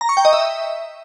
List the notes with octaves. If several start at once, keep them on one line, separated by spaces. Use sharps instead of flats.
A#5
C#6
G5
D#5
E5